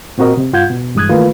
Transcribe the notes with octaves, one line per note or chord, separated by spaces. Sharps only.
A#2 C4 F#4 A#4 D#5
C3
G2 F4 F#5 G6 G#6
B2
G2 E3 G#3 D#6 F#6 G#6
D#3 E3 A3 A#3 F4 B4